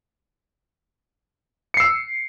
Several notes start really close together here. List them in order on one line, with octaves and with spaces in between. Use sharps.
C#7 C7 E6